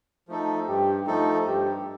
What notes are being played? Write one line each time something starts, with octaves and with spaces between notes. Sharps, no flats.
F3 A3 D#4 A4
G2 G4
F3 A3 D#4 A4
G2 G4